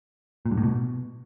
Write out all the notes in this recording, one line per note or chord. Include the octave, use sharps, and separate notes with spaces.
A#2
G2
A2
B2